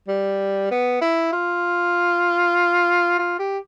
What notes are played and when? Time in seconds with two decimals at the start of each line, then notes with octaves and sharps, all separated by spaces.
0.09 G3
0.71 B3
1.02 E4
1.33 F4
3.19 F4
3.39 G4